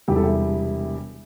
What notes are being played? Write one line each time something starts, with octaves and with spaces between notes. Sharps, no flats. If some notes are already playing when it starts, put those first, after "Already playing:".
E1 E2 C3 G3 G4
A4
E4 G4